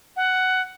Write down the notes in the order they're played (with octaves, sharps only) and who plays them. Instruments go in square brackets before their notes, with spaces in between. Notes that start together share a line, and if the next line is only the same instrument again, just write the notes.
[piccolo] F#5